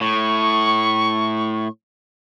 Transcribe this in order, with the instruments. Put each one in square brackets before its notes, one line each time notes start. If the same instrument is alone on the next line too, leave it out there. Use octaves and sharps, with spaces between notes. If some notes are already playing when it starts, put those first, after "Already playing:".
[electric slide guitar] A2 [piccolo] C#6